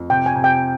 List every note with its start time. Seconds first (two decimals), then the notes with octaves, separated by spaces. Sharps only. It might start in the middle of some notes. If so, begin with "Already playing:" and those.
Already playing: F2
0.10 C3 G5
0.26 G#5
0.35 C3
0.44 G5